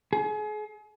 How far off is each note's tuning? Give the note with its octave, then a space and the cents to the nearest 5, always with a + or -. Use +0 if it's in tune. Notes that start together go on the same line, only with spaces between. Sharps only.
G#4 +35